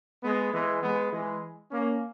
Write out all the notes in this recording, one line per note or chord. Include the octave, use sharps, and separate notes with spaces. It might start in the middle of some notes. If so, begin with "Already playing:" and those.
G#3 B3
E3 G#3
G#3 B3
E3 G#3
A#3 C#4